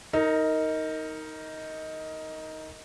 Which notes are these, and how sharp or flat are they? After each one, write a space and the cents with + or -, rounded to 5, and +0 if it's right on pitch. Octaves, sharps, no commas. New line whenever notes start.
D#4 +15 A#4 -15